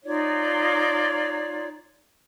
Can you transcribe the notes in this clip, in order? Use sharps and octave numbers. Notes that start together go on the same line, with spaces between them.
D#4 F4 C#5 D5